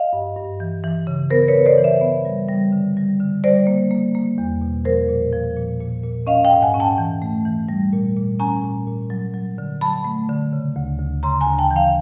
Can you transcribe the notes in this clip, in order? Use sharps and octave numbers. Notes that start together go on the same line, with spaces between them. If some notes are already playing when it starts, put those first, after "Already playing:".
Already playing: D#5 F5
G2
G2
E3
E3
C#3
B3 A#4 C5
B4 C#5
B3
C5 D5
E3
D5 E5
B3
G3
G3
D3
G3
D3
G3 C5 D5
A#3
A#3
A#3
E2
B2
F3 A#4 C5
A#2
F3
A#2
A#2
A#2
C#4 D#5 F5
F5 G5
G#2
F#5 G#5
C#4
G5 A5
E3
A3
E3
G3
A#2
A#2
C#4 G#5 A#5
A#2
A#2
F#3
F#3
D3
F#3 A5 B5
A3
D3
C#3
D2
D2
C#3 A#5 C6
G#5 A#5
D2
G5 A5
E3
F5 G5